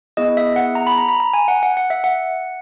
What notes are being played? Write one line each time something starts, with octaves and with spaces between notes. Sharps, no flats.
B3 E4 G#4 D#5
E5
F#5
A#5
B5
A#5
B5
A#5
G#5
F#5
F#5
F#5
E5
F#5